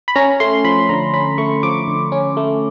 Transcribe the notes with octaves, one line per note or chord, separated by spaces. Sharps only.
B5
C#4 A#5
A3 C6
F3 B5
D3 A#5
C#4 B5
A3 C#6
F3 D6
D3
C#4
A3